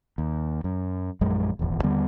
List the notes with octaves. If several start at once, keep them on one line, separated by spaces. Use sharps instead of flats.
D#2
F#2
A#1 F#2 G#3
D#1 G#1 E2
D#2 D3 G3 B3